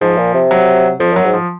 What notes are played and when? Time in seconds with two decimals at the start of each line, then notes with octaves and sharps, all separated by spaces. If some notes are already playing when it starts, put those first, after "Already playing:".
0.01 G#2 F3
0.18 A#2
0.35 C3
0.51 F#3
1.00 F2 F3
1.13 F#2 F#3
1.25 G#2
1.33 F3